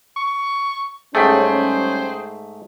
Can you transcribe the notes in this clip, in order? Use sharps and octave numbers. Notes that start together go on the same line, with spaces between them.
C#6
G#2 G3 A3 C#4 G#4 C5 G5 B6